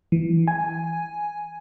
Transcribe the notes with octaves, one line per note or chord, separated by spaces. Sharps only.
E3
G#5